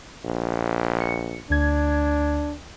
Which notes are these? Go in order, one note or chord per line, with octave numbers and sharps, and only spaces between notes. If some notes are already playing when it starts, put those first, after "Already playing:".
A#1
C#7
D2 D4 G#6